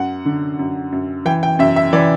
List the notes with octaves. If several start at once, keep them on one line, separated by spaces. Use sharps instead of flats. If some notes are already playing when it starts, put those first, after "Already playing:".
Already playing: F#2 F#5
D3
F#2
F#2
E3 G5
G5
F#2 E5
E5
E3 D5